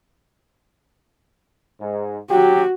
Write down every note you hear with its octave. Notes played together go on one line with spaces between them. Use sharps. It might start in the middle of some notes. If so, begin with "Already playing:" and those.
G#2
F#3 F#4 G4